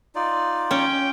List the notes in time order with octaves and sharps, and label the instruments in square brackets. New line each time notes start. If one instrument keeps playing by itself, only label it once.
[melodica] D#4 F4 D5
[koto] C#4 [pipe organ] G5